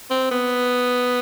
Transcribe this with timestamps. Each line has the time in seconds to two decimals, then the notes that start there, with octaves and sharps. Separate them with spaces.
0.10 C4
0.31 B3